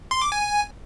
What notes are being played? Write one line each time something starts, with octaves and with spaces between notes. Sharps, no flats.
C6
D6
G#5